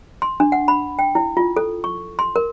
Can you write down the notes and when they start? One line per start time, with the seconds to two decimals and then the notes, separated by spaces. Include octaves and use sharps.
0.22 C6
0.40 D4
0.52 F#5
0.68 B5
0.99 G5
1.15 E4
1.37 F4
1.57 A4
1.84 C#6
2.19 C6
2.36 A#4